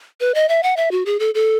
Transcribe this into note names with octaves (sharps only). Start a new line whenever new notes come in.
B4
D#5
E5
F#5
E5
F#4
G#4
A4
A4